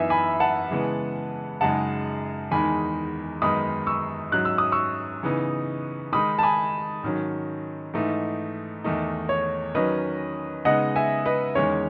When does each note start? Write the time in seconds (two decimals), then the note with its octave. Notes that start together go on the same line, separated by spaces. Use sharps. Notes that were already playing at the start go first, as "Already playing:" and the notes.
Already playing: F#2 E3 B3 D#4 E5 G#5
0.10 G#5 B5
0.40 F#5 A5
0.70 C#3 E3 G#3 B3
1.61 F#2 C#3 G#3 D#4 F#5 A5
2.51 E2 D#3 G#3 D#4 G#5 B5
3.42 F#2 D#3 G#3 B3 D#4 B5 D#6
3.87 C#6 E6
4.32 G#2 F#3 C#4 F#6
4.45 E6
4.58 D#6
4.72 C#6 E6
5.23 C#3 E3 B3 D#4
6.12 D#3 G#3 D#4 B5 D#6
6.39 A5
6.43 G#5 B5
7.03 G#2 D#3 F#3 C#4
7.93 G#2 E3 A3 D#4
8.84 E2 D#3 A3 D#4
9.29 C#5
9.75 D#3 F#3 C#4 B4 D#5
10.65 C#3 G#3 B3 D#4 D#5 F#5
10.96 E5 G#5
11.26 B4 D#5
11.55 E2 D#3 G#3 C#4 C#5